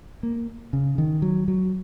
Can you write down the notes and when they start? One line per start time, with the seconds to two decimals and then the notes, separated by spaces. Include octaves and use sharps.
0.23 A#3
0.73 C#3
0.98 D#3
1.22 F#3
1.48 F#3